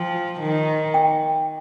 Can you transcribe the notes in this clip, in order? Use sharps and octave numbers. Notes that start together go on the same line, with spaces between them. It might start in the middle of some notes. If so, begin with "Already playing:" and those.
Already playing: F3 G5
D#3
G5